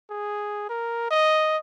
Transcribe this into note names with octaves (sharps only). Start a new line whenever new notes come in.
G#4
A#4
D#5